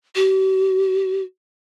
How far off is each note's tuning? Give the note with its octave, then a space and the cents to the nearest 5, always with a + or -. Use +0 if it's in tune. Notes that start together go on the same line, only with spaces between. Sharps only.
G4 -45